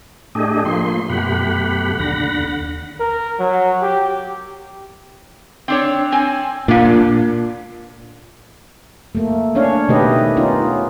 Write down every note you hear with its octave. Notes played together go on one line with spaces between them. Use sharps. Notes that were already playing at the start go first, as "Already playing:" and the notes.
A2 A3 D4 G4 G#4 D#5
F3 A#3 C6
F#2 B2 A3 G4 F#5 B5
D#2 D3 F#5 B5 A#6
A#4
F#3
G4
C4 D4 C#5
C4 G#5
A#2 A#3 D4
A3 A#3
C#4 D4 C#5 F5
B2 D#3 A3 G4 B4 D#5
B3 C#4 D#4 F4